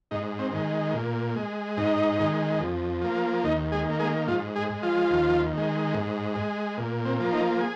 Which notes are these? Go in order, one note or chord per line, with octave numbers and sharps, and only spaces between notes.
G#2 D#4
C4
D#3 G#3
A#2
G#3
G#2 D#4
D#3 G#3
F2
F3 A#3
D#2 D#4
G#3 G#4
D#3 A#3
G#3 G#4
G#2 F3 F4
G#3 G#4
G#3
F3 F4
D#2
D#3 G#3
G#2
G#3
A#2
C4
F3 A#3
D#4
G#4